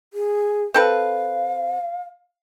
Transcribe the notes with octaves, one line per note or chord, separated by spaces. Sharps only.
G#4
C4 A4 B4 F5